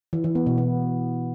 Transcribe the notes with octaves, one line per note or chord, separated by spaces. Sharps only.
E3
E3
B3
B2
B3